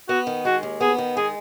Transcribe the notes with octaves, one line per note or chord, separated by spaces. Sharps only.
B3 F#4
D#3
G#3 F#4
D#2
B3 G#4
D#3
G#3 G#4